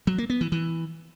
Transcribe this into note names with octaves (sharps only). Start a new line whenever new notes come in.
F#3
A#3
B3
E3
E3